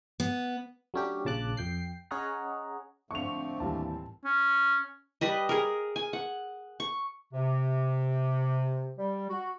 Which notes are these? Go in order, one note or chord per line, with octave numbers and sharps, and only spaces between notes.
B3
F#3 A3 C#4 D4 G4
A#1 C#3 A5 D6 F#6
F2 G5 C7
C#4 G#4 C#5 D#5 F#5 A#5
A2 D3 F3 A3 C4 C#6 F7
D#2 E3 G3 A5
C#4
G3 B4 D#5
G#4 A#4
G#5
F#5
C#6
C3
G3
F#4